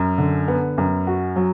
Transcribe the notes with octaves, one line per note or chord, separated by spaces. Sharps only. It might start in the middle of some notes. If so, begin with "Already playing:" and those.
Already playing: F#2
D3
B3
F#2
F#4
F#3